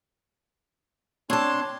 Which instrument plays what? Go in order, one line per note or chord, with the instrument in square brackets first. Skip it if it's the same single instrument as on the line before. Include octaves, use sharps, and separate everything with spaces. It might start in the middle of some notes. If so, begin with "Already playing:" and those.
[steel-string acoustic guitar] C4 A5 [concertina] D4 C#5 C6